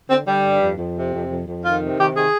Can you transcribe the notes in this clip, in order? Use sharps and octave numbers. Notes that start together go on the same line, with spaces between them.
D3 C4
D3 G3
G2
F2
F2
C3
F2
F2
F2
D#3 F4
C3
D#3 G4
D#3 G#4